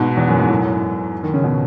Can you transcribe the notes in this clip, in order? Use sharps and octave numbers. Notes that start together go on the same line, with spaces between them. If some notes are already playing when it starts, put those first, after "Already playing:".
Already playing: G#2 B2
E2
F#2
G#2
F#2 A2
D#3
C#3
B2